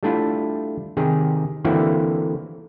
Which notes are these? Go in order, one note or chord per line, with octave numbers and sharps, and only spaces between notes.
G3 A3 D4 E4 F4
C3 D#3 G4 G#4
D3 E3 A#3 C4 E4 F#4